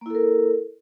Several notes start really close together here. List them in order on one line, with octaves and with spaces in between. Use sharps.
A#3 E4 A4 A#4